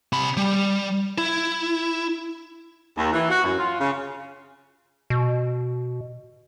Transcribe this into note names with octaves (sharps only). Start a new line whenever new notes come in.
C3 B5
G3
E4
D#2
E3
F#4
F#2
F4
C#3
B2